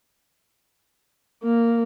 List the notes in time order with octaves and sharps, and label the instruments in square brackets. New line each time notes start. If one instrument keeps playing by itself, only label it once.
[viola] A#3